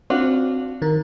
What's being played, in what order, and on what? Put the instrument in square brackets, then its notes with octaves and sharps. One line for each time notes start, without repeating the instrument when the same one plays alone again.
[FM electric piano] C4 [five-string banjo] D4 F4 F#4
[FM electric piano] D#3 A#4